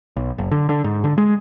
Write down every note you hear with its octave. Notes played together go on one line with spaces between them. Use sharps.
B1
F#1
D3
D3
G#2
D3
G#3